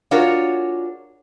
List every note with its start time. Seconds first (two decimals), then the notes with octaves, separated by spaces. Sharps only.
0.11 D4 F4 F#4 G#4 A#4 C#5